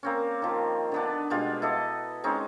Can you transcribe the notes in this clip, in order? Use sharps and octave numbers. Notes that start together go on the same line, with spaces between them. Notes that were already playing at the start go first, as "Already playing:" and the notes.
A#3 C4 C#4
D#3 F3
D3 B3 D4
B2 G3 G#3 F4
E4 A4 D#5
G#3 C4 C#4 D#4